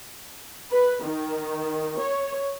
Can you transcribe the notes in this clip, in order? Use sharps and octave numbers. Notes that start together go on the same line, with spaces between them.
B4
D#3
C#5